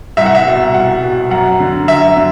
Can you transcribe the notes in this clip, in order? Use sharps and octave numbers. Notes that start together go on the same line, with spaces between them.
C2 E5
F#5
E5
B2
C2 F#5
B2
F#2 F#5
D3
F#2 E5
D3